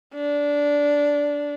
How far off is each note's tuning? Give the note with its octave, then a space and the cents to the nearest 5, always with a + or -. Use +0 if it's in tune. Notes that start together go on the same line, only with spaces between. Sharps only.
D4 -15